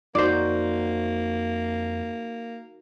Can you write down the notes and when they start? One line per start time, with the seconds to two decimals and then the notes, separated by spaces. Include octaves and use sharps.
0.15 F2 A#3 D#4 F#4 C5 D5